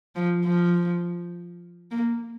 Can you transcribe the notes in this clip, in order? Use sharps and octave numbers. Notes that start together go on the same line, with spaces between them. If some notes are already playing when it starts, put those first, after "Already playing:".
F3
F3
A#3